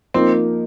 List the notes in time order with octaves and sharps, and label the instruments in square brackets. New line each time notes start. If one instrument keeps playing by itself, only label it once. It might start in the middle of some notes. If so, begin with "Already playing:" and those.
[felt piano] F3 A#3 D#4 A#4 [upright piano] C4